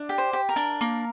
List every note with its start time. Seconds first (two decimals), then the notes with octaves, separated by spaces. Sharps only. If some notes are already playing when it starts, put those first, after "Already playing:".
Already playing: D4
0.09 G4
0.18 C5
0.33 G4
0.49 A#4
0.56 D4
0.81 A#3